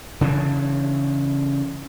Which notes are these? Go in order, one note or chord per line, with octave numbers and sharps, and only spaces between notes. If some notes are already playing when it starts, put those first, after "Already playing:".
C#3 E3 D4